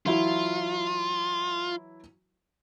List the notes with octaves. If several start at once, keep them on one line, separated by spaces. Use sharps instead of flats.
E3 F#3 E4 F4